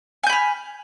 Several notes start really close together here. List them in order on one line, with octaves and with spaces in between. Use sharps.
G#5 G6 B5 F6